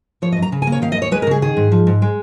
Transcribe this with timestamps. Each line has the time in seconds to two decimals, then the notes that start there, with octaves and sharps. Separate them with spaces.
0.22 F3 C#5
0.32 D#5
0.37 F#2
0.42 A#5
0.52 C#3
0.62 G#5
0.67 A#3
0.72 C#5
0.82 D#3 F5
0.92 D#5
0.97 D#2
1.02 C#5
1.12 G#3 B4
1.22 A#4
1.27 C#3 G#4
1.42 D#3 G#4
1.57 G#2
1.72 F3
1.87 G#2
2.02 G#3